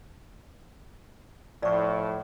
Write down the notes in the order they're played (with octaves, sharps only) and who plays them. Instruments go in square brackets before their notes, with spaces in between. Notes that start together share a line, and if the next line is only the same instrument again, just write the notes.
[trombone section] A2 F3 [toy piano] D5 C#6